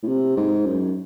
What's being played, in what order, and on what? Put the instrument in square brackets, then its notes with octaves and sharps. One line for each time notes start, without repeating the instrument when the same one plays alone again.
[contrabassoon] A2
C3
G#2
F#2